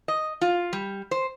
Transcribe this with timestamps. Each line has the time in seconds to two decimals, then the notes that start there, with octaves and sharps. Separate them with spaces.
0.08 D#5
0.41 F4
0.73 G3
1.11 C5